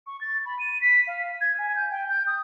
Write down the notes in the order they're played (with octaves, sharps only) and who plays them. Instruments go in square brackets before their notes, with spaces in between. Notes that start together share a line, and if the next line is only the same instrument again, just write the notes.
[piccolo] C#6
A6
B5
D#7
B6
F5
G#6
G#5
G6
G5
G6
D#6